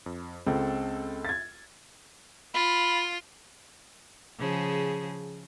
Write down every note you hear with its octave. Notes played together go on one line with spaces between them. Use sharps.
F2
C#2 C4 A4
G#6 A6
F4 B5
C#3 F3 G#4